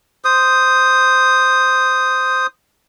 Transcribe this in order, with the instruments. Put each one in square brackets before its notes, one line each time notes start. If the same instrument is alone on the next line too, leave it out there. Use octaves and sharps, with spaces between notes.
[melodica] C5 D#6